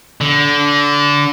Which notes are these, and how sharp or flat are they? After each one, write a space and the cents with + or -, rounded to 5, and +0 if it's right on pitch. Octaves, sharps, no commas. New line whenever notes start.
D3 -20